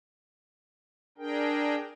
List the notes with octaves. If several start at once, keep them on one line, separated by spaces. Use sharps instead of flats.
D4 G#4 A#4 G5